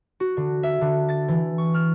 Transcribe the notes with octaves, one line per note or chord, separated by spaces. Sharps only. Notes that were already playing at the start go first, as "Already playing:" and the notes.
F#4
D3
E5
D3
A6
E3
C#6
F6